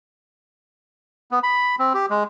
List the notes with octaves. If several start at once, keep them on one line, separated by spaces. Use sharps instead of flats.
B3
B5
C4
G4
G#3